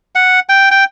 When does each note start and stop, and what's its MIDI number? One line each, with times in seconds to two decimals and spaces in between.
0.15 0.40 78
0.49 0.69 79
0.71 0.84 79